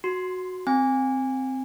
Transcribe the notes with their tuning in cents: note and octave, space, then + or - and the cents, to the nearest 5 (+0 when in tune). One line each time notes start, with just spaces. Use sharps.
F#4 -5 C6 +0
C4 +0 G#5 -20